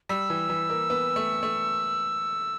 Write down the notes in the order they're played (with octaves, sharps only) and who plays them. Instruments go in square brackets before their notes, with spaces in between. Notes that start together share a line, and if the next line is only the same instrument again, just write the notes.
[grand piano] G3 [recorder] E6
[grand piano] E3
E3
A#3
B3
A3
A3